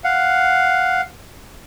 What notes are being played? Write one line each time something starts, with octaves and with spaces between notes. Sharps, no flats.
F5 F#5